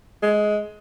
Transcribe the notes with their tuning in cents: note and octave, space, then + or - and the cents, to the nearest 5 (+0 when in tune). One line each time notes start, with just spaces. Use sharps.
G#3 +15